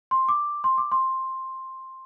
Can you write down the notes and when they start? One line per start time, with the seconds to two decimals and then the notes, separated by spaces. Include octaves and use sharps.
0.11 C6
0.29 D6
0.64 C6
0.78 D6
0.92 C6